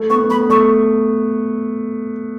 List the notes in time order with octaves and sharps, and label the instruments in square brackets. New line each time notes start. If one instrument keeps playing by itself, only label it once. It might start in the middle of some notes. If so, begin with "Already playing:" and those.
Already playing: [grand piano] A3
[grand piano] B3 [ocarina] C#6
[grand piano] B3
[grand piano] A3 [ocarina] B5
[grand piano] B3
[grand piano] A3 [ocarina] C#6